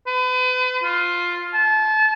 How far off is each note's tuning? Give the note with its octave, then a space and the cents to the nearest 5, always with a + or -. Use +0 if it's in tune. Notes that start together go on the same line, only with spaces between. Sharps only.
B4 +40
F4 +5
A5 -30